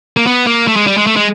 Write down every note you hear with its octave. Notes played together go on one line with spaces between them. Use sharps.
A#3
B3
A#3
A3
G#3
G3
G#3
A3
G#3